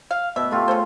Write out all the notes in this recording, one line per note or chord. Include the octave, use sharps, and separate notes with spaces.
F5
B2 E5
A3 F4 G4
C#3 A4 C5